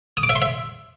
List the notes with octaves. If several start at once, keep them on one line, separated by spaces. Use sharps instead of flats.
D#6
D6
E5
C6
E5